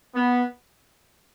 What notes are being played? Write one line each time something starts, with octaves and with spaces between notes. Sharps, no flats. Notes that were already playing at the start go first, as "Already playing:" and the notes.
B3